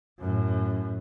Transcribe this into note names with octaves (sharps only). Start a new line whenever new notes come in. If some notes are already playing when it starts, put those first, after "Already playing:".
F#2 A2